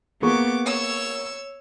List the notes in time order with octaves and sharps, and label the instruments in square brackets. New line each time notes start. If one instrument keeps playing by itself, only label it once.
[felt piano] A#3 G#4 C#6 [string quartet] B3 D6
[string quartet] C#5 E6